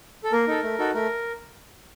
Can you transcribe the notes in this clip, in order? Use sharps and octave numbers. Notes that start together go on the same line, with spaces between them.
A4
A#3 A#4
D#4 A4
A3
D#4 F#4 A4
A3 A#4